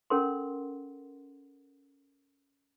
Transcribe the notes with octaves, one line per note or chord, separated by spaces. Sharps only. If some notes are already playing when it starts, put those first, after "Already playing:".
C#4 A4 A#4 F#5 C6